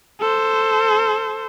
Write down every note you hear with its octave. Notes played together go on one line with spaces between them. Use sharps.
A4 C5